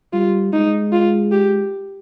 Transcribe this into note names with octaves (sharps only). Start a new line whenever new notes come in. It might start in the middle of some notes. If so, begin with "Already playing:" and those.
G3 F4
G#3 D#4
F4
G4